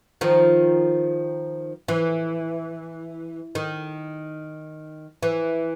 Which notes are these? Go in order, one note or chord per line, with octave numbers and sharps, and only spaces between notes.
D#3 F3
E3
D#3
E3